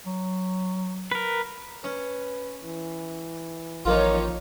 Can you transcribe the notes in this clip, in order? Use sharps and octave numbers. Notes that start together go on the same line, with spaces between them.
F#3
A#4 B4
C#4 B4
E3
A1 D#3 F3 A#3 D#4 F4 C#5